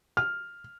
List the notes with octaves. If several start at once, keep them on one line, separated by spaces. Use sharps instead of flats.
F6